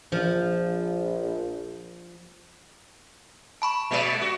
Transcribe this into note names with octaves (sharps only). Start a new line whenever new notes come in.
A#1 F3
A5 B5 C#6
B2 G#3 D5
F#4